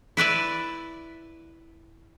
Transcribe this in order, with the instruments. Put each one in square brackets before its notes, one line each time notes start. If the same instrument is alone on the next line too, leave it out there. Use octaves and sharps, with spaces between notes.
[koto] E4 B4 D5 E5